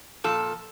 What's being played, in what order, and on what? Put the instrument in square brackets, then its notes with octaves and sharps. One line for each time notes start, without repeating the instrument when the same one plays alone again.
[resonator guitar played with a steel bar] A#2 F3 A4